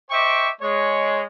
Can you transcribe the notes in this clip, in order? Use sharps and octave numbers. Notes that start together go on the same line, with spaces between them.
C5 D#5 E5 G5 C#6 D6
G#3 C#5